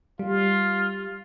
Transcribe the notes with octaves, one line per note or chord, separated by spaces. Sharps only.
G3 F4